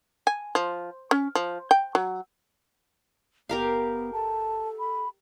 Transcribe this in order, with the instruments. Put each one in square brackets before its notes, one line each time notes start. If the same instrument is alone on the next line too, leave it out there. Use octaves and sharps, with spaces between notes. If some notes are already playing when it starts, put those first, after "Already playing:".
[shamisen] G#5
F3
C#4
F3
G5
F#3
[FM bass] F#1 [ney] B3 [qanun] G4 A#4 F5
[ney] A4 [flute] A5
[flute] B5